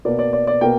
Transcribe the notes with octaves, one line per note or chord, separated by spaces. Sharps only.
B2 A#3 D5
D5
D5
D5
B2 A#3 G5